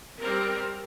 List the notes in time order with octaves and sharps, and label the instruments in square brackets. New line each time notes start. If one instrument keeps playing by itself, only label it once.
[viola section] G3 C4 A#4